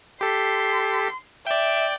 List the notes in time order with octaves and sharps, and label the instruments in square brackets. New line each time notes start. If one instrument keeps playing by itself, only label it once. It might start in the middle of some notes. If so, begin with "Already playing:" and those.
[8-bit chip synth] G4 A4 B6 [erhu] C6
[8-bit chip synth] D5 G5 [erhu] E5